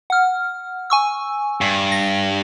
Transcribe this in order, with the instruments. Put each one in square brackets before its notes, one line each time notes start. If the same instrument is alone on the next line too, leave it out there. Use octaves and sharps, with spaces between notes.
[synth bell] F#5 F6
G#5 C#6 E6
[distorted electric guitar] G2
[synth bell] A#6